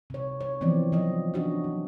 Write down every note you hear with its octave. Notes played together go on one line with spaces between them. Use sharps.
C3 C#5
C#5
E3 F3 B3 C4 D5
F3 F#3 D#5
C#4 D4 F#4 D#5
F#3